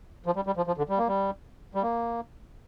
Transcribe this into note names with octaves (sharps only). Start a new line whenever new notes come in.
F3
G3
G3
F3
F3
D3
G3
A#3
G3
G3
A#3